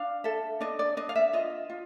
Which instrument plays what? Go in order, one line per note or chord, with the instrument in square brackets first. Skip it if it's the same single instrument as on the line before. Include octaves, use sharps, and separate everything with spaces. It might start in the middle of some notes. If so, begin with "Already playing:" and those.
Already playing: [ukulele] D4 F5
A4 E5
D4 D#5
D5
D4 D#5
F5
E5
F4 D#5
F4